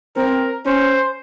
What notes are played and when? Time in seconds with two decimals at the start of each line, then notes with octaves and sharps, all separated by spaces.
0.16 C4 A#4
0.65 C#4 C5